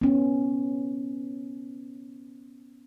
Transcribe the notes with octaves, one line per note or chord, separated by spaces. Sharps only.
B3 C#4